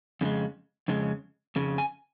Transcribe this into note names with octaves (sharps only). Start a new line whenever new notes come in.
F2 C#3 G#3
F2 C#3 G#3
F2 C#3
G#5